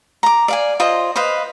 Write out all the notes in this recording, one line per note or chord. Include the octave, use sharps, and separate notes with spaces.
A#5 D6
D5 F5 G#5
F4 C5 D#5
B4 C5 D#5 F5